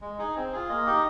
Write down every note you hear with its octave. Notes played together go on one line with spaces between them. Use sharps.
G#3
D#4 G#4
C4
F4 G#4
A#3 D#5
D#4 G4